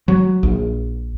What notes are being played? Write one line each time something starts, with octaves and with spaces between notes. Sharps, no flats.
F#3
A#1